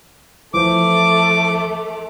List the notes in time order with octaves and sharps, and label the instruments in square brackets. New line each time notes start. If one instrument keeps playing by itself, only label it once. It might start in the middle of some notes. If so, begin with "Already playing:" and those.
[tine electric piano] E3 F3 C5 [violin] A3 [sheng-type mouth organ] D6